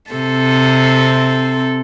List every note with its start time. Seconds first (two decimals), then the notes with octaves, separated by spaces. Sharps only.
0.11 C3 C4 A4